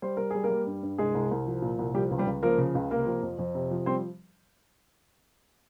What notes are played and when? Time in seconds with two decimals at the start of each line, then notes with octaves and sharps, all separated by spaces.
0.02 G3 C5
0.17 G3 A#4
0.30 G3 G#4
0.44 A#3 A#4
0.51 G3
0.67 G2
0.83 G2
0.98 C2 G#3 G#4
1.14 C2
1.31 C2
1.47 F3
1.62 A#2
1.79 C2
1.95 F3 G3 G4
2.11 C#2
2.18 G3 G4
2.27 C#2
2.43 F3 A#3 A#4
2.58 C#3
2.75 C#2
2.91 C3 A#3 A#4
3.06 F3
3.23 F2
3.39 F2
3.55 C3
3.71 F3
3.86 G3 C4 C5